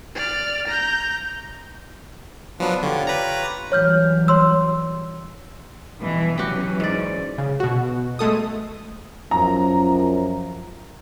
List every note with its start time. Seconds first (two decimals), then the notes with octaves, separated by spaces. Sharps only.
0.15 D5 F6
0.67 A#5 G6
2.60 F3 F#3 B3 D4 B4
2.83 D3 F4 G4 C#5
3.07 B4 A#5
3.72 E3 F#3 G3 C#5 F6 G6
4.28 C#5 C6 E6
6.00 B2 E3 G3
6.38 E3 F#3 C#4 F#4 G4
6.80 G#2 D5
7.38 C#3
7.60 B2 F#4
8.19 G#3 A3 A4 D#6
9.31 F#2 F3 A#5